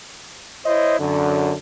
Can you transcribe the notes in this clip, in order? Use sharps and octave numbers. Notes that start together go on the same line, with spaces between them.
E4 C5 C#5 D#5
F#2 D3